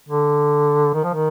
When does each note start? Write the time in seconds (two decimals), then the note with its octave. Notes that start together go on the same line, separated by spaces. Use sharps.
0.09 D3
0.94 D#3
1.04 F3
1.14 D#3